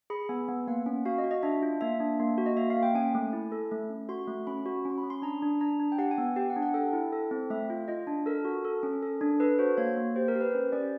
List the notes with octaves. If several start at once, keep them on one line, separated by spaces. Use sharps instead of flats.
G#4 B5
B3 G#5
B3
A#3 F#5
C#4
F#4 F5
D#5
F#4
D#5
D4 E5
F4
A#3 E5
D4
A#3
F#4
D#5
A#3 E5
F5
A#3
G5
C#4 G#5
A3
E4
A4
A3
C#4
F#4 C6
A3
C#4 B5
F#4
C#4 C6
B5
C#4
C6
D4 A#5
D4
D4 A#5
D4
G5
G4 F#5
G#5
B3
G4 G5
F#5
D4
F#5
A4 G5
E4
A4
C4
A3 E5
F4
F4 D#5
D4
A4 A#4
F#4
A4
C#4
A4
D4
A4 B4
F#4 C5
A#3 C#5
A#3
G4 C5
A#4
G4
B4
C#4 C5
C#4 D5